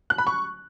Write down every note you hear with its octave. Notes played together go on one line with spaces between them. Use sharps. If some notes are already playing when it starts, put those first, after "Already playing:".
F#6
B5
C#6